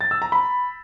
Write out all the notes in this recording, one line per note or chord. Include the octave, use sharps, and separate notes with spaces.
A6
E6
A#5
B5